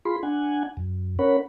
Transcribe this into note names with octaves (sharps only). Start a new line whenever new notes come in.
F4 G#4 B5 C6
D4 F#5 G#5
F#2
C#4 A#4 C#5 F#5 B5